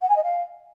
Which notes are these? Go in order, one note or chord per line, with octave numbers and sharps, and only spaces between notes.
F#5
G#5
D#5
F5